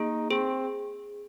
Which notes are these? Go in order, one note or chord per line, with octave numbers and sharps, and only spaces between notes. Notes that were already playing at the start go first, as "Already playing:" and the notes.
Already playing: A#3 D#4 G#4
C4 G#4